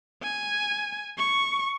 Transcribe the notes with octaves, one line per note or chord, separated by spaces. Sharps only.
G#5
C#6